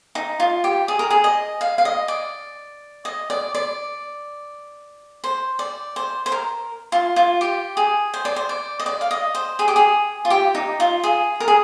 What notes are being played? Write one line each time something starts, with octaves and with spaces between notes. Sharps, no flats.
D#4
F4
G4
G#4
A#4
G#4
D#5
F5
F5
D#5
D5
D#5
D5
D5
C5
D5
C5
C5
A#4
F4
F4
G4
G#4
C5
D5
C5
D5
D#5
D5
F5
D#5
C5
G#4
G4
G#4
F4
G4
D#4
F4
G#4
A#4
G#4